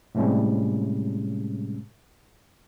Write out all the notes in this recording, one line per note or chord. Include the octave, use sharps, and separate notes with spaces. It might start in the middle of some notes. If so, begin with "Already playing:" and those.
A2 C3 G3 G#3 C#4